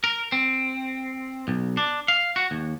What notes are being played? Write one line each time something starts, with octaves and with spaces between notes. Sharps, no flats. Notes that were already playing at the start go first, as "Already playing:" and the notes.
A#4
C4
B1
D4
F5
F#4
D#2